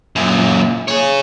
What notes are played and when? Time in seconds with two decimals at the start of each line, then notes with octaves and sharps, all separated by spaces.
0.16 F#2 A#2
0.88 G#4 C#5